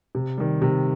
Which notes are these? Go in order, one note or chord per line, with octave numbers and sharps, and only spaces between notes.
C3
D#3 G3
C3